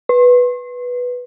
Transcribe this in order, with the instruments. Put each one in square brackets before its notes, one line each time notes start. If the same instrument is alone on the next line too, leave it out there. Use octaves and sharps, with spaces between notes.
[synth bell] B4